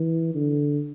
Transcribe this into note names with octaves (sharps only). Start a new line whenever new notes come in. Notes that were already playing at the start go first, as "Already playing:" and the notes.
Already playing: E3
D3